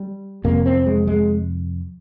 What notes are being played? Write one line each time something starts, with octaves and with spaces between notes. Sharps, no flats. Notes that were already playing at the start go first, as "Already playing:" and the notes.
Already playing: G3
F2 C3 A#3
C4
G#3
G#3